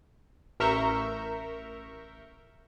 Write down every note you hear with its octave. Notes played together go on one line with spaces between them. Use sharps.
A1 A#4 E5 A#5 C#6 G6